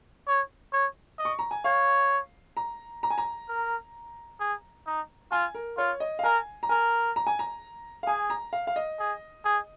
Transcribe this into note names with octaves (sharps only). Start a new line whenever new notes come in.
C#5
C#5
D#5
C#6
A#5
G#5
C#5 F5
A#5
A#5
G#5
A#5
A#4
G#4
D#4
F4 G#5
A#4
F4 C#5
D#5
F5
A#4 G#5
A#5
A#4 G#5
A#5
G#5
A#5
F5
G#4 G#5
A#5
F5
F5
D#5
G#4
G#4